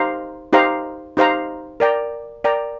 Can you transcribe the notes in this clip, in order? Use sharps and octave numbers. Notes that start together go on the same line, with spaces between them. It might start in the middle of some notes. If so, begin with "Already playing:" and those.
Already playing: D#4 G4 C5 F5 A#5
D#4 G4 C5 F5 A#5
D#4 G4 C5 F5 A#5
A#4 D5 G5 A#5
A#4 D5 G5 A#5